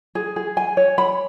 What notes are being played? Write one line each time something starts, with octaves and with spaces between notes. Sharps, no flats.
G#4
G#4
G#5
C#5
B5